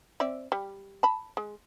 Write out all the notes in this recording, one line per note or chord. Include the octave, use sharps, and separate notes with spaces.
C4 D5 E5
G3
A5 B5
G#3